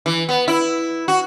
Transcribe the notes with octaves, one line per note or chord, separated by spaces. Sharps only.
E3
B3
E4
F#4